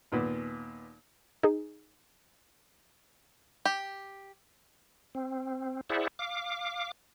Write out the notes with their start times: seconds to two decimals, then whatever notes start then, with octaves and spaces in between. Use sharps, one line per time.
0.12 D#2 A#2 B3
1.43 D#4 G#4
3.65 G4
5.15 C4
5.90 E4 G#4 C5 D5 E5 F#5
6.19 F5 D6